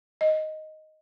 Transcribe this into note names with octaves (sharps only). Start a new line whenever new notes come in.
D#5